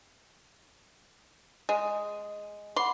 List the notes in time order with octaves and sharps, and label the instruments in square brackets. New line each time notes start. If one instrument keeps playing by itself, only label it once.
[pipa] G#3
[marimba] F#5 B5 D6 [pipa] C6